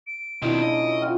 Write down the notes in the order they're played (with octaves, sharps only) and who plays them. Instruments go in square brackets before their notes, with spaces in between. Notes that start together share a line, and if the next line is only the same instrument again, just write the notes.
[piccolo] D7
[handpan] B2 E4 [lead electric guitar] D#3 C4 [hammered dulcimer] D4 A#4 D#5
[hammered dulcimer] C#3 [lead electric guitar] D#5
[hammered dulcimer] C#5 E5
[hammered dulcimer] F4 F#4 G5 [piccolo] F6